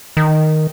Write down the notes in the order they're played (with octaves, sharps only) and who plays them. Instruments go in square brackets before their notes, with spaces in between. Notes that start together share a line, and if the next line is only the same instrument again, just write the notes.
[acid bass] D#3